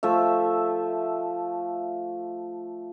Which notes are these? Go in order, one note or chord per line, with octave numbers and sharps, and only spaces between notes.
F3 A3 E5